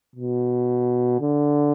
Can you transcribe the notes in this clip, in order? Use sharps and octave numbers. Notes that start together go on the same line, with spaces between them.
B2
D3